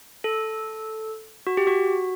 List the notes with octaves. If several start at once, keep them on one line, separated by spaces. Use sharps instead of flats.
A4
F#4
G4
F#4